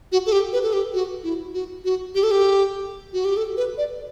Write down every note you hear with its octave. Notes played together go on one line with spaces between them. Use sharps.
F#4
A4
G4
B4
A4
G4
F#4
E4
F#4
F#4
G4
A4
G4
F#4
G4
A4
B4
D5